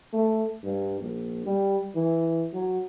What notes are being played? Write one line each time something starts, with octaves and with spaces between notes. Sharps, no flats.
A3
G2
A#1
G3
E3
F#3